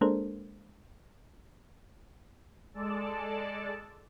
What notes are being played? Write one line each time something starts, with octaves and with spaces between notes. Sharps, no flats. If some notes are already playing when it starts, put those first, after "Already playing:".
G#3 A#3 D4 A4 A#4 C5
G#3 A4 D5 A5